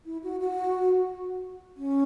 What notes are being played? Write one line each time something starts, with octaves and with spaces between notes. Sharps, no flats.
E4
F#4
F#4
C#4